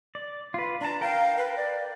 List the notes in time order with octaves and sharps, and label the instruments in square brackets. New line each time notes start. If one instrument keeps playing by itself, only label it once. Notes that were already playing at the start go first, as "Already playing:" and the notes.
[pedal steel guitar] D5
F4 B4
[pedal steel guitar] D4 A5 [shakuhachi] A#5
[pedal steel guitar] A#4 G5 [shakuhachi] F5
[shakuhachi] B4
D5